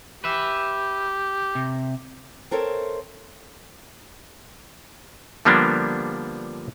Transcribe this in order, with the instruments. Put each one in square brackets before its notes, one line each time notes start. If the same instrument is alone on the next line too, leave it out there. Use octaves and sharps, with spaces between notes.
[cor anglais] G4 [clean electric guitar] B4 E5
[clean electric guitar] C3
[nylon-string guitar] C4 A4 A#4 C#5 E5
[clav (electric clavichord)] D3 F3 G3 A#3 B3 D4